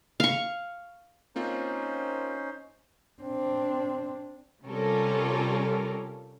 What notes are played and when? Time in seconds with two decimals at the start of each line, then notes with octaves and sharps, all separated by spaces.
0.20 F5 C#6
1.36 A#3 C4 C#4 D#4 F4 C5
3.22 C4 D4
4.65 C3 G3 C#4 F4 A4 A#4